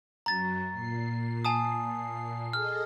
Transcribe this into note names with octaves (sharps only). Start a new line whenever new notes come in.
F#2 F#3 A#5 A6
A#2 C7
G#5 A5 D#6
G#4 A4 D#5 F6